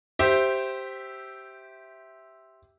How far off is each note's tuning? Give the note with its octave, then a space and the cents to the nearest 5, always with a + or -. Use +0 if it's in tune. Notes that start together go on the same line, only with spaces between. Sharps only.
G4 -10 C5 +0 E5 -5